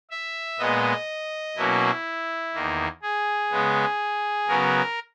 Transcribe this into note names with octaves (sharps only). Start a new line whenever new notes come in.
E5
A#2 G#3 B3 D#5
B2 F#3 A#3 C#4 E4
E2 D#3 A#3
G#4
C#3 G#3 B3
C#3 F#3 B3 A#4